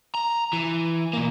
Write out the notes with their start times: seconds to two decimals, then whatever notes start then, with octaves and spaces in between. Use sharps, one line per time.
0.15 A#5
0.53 E3
1.13 B2 A#3